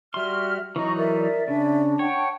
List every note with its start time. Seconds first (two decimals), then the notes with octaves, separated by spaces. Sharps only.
0.14 G3 F#4 E5 C6 F6
0.76 E3 F#3 D#4 D#5 A#5 C#6
0.97 A#4 D5 E5
1.48 C#3 D4
1.99 C#5 F#5 G5 A5